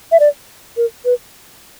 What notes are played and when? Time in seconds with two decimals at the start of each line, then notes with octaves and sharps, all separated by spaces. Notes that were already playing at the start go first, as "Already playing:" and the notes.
0.12 E5
0.20 D5
0.77 A#4
1.05 B4